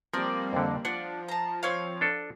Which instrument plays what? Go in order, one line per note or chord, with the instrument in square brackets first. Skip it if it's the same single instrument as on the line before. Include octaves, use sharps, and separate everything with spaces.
[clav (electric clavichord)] F3 [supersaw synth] G3 A#3 C4 [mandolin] A#4 D5
[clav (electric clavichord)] F2 D3
[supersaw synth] F3 [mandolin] D4 [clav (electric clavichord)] F#5
[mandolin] A5 A#5
C4 C#5 F5
[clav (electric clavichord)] D4 A4